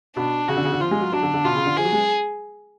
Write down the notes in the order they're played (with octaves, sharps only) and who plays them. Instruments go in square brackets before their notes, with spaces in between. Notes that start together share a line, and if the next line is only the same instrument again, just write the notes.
[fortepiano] B2 [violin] D4
[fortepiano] C#3 [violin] F#4
[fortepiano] D3
C#3
D3
[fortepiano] F3 [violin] F4
[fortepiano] G#3
F#3
[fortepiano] F#3 [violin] D4
[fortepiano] D3
D3
[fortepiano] B2 [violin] F4
[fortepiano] C#3
D3
[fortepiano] F3 [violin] G#4
[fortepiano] F#3
G#3